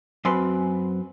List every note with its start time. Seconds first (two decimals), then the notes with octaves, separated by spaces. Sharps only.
0.25 F#2 C4 B4 C6